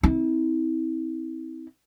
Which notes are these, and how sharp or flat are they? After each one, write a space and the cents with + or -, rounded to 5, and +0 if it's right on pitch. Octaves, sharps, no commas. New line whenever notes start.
C4 +0 E4 -40